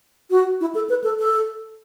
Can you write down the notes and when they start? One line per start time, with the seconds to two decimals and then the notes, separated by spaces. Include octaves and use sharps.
0.30 F#4
0.61 E4
0.75 A4
0.89 B4
1.04 A4
1.19 A4